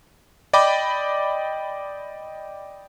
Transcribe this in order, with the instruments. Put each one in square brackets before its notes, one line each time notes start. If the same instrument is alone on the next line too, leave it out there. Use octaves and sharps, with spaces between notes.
[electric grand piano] D5 D#5 G5 B5 D6